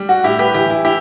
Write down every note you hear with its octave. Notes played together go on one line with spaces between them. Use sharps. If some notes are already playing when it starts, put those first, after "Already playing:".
Already playing: G3
F#4
A2 E4 G4
G4 B4
E3 E4 G4
E4
E4 G4